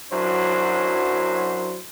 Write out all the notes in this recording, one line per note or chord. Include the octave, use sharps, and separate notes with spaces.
F#2 F#3 D4 E4 C5